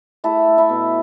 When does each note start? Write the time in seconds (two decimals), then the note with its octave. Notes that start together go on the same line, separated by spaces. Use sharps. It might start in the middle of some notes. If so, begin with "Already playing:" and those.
0.24 A3 E4 A4
0.46 A3
0.58 E4
0.69 B2